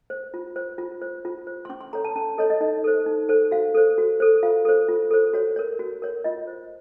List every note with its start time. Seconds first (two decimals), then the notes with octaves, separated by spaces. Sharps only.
0.10 C5
0.34 F4
0.56 C5
0.78 F4
1.02 C5
1.25 F4
1.47 C5
1.65 C6
1.69 C#4 C#6
1.81 C6
1.93 A4 C#5 A#5
2.04 A5
2.15 C#4 A5
2.38 A4 C#5 D#5
2.50 D#5
2.61 D#4 D#5
2.84 A4 C5
3.06 D#4
3.29 A4 C5
3.51 F#4 F5
3.74 A4 C5
3.98 F#4
4.20 A4 C5
4.43 F4 F5
4.65 A4 C5
4.89 F4
5.11 A4 C5
5.33 F#4 C#5
5.56 A#4 C#5
5.79 F#4
6.02 A#4 C#5
6.24 F4 D#5
6.47 C5